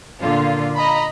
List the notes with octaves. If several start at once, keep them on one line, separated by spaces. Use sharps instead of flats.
A#2 D3 F4
D#5 A#5 B5